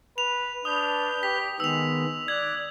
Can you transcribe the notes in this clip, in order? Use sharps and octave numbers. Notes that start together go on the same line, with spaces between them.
B4 F7
D4 B4 D#6 G6
G4 B6
D#3 G#3 B3 E6 F7
D5 F#6 G#6